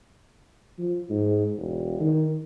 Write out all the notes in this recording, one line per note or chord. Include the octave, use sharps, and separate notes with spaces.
F3
G#2
E1
D#3